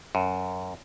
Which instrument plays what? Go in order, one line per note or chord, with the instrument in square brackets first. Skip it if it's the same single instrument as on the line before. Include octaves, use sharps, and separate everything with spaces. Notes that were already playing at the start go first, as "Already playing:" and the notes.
[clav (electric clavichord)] F#2